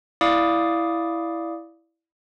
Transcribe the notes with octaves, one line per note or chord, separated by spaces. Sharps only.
E4 D5 F5 D6 D#6